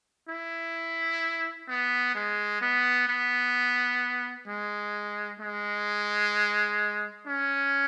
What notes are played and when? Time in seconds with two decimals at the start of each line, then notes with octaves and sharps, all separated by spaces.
0.29 E4
1.68 B3
2.15 G#3
2.61 B3
3.08 B3
4.48 G#3
5.40 G#3
7.27 C#4